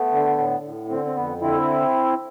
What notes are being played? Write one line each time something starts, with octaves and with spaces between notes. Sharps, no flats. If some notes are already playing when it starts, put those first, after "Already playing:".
Already playing: A3 B3
D3
A2
A2
D3 C4
C4
F2 B3
D3 C4 E4